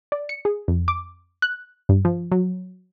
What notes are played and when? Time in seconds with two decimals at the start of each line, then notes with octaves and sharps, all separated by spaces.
0.12 D5
0.29 C#7
0.45 G#4
0.68 F2
0.88 D6
1.42 F#6
1.89 G2
2.05 F3
2.32 F#3